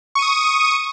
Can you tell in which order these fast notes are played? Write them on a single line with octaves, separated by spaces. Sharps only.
C#6 D#7 D#6